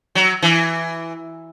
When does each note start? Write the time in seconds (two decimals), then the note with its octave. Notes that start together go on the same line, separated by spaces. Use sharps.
0.15 F#3
0.42 E3